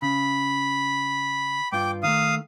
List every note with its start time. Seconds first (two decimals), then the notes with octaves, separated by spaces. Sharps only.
0.02 C#3 B5
1.72 G2 F4 G5 D6
2.03 D#3 A3 F5 D#6